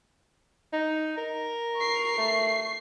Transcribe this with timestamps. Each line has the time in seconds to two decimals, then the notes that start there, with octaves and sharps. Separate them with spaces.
0.73 D#4
1.18 A#4
1.76 C#6 C7
2.18 A3